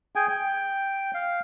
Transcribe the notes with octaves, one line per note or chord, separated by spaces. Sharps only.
G#4 G5 G#5
G5
F5